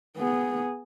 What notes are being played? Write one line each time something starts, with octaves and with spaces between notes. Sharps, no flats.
B3 G#4